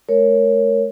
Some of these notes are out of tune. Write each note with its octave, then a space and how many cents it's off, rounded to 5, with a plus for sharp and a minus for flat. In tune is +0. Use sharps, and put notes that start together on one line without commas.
A3 -40 A#4 +0 C#5 +0